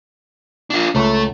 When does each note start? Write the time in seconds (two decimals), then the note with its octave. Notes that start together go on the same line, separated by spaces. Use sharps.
0.70 D4 F4
0.95 C#2 A3 C#5 A5